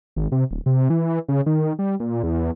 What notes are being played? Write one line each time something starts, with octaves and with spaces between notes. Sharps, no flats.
G#1
C3
D1
C3
E3
C#3
D#3
G3
A#2
E2